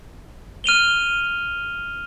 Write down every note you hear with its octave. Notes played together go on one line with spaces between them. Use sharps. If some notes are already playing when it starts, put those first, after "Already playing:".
F6 D#7 F7 G7